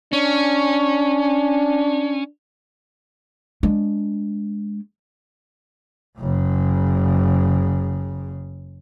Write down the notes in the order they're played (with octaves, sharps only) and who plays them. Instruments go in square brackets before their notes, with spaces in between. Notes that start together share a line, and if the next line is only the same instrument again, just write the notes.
[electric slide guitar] C#4 [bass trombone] D4
[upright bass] G#3 D4
[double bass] F#1 C#3